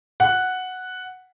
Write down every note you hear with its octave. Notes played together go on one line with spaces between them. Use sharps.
F#5